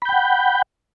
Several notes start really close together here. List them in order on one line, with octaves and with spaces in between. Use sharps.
B5 G6 G5 F#5